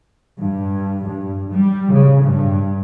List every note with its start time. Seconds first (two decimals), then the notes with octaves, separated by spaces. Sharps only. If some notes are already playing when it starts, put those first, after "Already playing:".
0.42 G2
1.09 G2
1.53 G3
1.93 C#3
2.25 G2